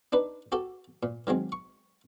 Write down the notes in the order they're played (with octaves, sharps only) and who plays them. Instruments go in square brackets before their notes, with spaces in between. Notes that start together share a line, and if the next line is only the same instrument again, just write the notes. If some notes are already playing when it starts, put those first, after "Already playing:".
[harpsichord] D4 D#4 B4
F#4 G4 A4
A#2
D#3 F#3 G#3 C4
C#6